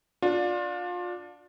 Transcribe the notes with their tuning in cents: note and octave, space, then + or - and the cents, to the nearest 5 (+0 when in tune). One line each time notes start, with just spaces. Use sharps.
D4 +0 F4 +30